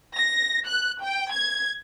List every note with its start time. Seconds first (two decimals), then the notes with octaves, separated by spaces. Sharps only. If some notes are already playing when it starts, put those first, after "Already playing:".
0.16 A#6
0.66 F#6
1.03 G5
1.32 G#6